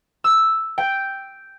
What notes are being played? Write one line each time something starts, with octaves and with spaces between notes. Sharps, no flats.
E6
G5